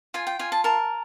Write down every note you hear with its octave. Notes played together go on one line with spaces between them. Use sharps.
F4 G#5
G5
F4 G#5
A5
A#4 A5